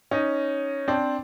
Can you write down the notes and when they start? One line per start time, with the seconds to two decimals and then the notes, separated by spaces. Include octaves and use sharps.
0.11 C#4 D#4
0.88 C4 D4